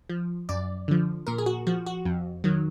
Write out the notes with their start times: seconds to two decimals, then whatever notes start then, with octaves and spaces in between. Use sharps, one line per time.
0.09 F3
0.49 F#2 D5
0.88 D3 F3
1.27 A#2 A#4
1.38 G#4
1.46 F#4
1.67 F3 F#4
1.86 F#4
2.05 F2
2.44 D#3 F#3